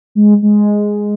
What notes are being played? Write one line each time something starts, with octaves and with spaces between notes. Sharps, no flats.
G#3
G#3